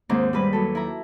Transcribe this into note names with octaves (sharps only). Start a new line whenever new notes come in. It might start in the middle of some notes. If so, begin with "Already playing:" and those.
D#2 G#2 D#3 G#3 A#3 C4
G3 G#3 B4
F#3 A4
E4 A#5